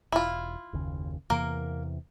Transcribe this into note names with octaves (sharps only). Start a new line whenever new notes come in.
E1 E4 F4
F#1 D#2 C#3
E2 C3 E3 A#3 A#4